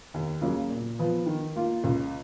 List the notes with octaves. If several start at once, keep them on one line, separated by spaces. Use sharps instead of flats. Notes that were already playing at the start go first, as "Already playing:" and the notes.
D#2
C#3 F#3 A#3
A#2
F3 B3
D#3
A#3 F4
C#2